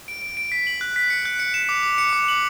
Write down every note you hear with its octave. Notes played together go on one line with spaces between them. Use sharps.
D7
D7
D7
B6
F#7
F#6
B6
C#7
F#6
C#7
E7
D6
D6
C#7
D6
F#7